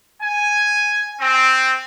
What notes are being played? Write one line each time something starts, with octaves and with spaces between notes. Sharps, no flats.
G#5
C4